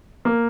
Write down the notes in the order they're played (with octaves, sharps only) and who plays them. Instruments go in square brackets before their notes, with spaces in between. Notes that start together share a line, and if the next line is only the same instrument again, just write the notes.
[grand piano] A#3